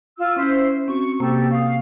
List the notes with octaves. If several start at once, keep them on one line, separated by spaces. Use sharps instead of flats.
F4 E6
C#4 E4 C5
C4 F#4 C#6
C3 A#3 G4 A4
F5 C#6 D#6